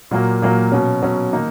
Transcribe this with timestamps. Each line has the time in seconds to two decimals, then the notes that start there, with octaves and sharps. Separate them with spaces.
0.11 A#2 F#3 A#3
0.42 A#2 F#3 A#3
0.72 B2 F#3 C#4
1.02 B2 F#3 C#4
1.33 D#3 A#3 D#4